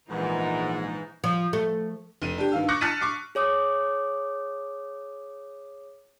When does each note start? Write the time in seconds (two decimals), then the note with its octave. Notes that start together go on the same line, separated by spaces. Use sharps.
0.10 A#1 G#2 E3 G#3 B3 D#4
1.24 F3
1.53 A3
2.22 F1 D#7
2.38 D4 G4
2.52 G2 D#3 F5 E6
2.68 C#6 D6 E6 F#6 A#6 C#7
2.81 A5 F6 F#6 A6 B6 D#7
3.01 C#6 D6 C7
3.35 G#4 C#5 D6 D#6